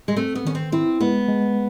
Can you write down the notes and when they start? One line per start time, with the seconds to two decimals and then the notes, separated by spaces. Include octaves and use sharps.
0.08 G#3
0.16 A3 C4
0.35 B3
0.45 D#3 C#4
0.55 C4
0.72 C4 E4
1.00 G#3 B3
1.28 G#3